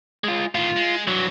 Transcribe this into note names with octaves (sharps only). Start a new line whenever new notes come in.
G#3 F4
A2 D#3 F4
G#3
G2 E3 F#3